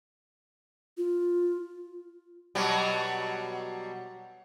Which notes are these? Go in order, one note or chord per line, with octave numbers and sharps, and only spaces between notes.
F4
B2 F#3 G3